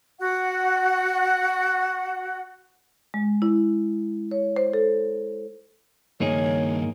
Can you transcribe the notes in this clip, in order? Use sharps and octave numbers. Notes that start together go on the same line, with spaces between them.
F#4 F#5
G#3
E4
C#5
C5
A4
G2 D#3 A#3 D#4 G#4 C#5